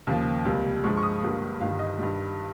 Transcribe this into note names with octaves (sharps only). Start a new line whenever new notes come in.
D#2 C#3 F3 A#3
C#2 C3 G3 A#3
G2 F3 G#3 C#6
C#6
D#6
G1 G2 G3 A#3
G1 G2 D#3 G3 F5
D#5
G2 D#3 G3